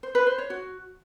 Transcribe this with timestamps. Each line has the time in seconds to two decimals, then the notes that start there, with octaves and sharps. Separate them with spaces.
0.03 C5
0.15 B4
0.27 C5
0.38 C#5
0.50 F#4